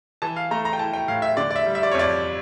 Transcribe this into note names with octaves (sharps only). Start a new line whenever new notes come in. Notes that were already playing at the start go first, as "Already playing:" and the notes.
E3 A5
F5
A3 A#5
A#5
G5
E4 A5
G5
A2 F5
E5
D3 D5
D5
E5
G3
E5
D5
C#5
F2 D5